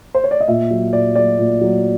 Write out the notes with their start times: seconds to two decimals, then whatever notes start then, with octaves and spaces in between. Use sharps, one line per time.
0.14 C5
0.24 C#5
0.31 D5
0.40 D#5
0.48 A#2 E5
0.71 F#3
0.93 A#2 D5
1.15 F#3 D5
1.39 A#2
1.61 F#3